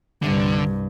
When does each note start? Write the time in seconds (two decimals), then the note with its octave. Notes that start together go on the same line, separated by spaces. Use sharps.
0.22 C2 G2 D3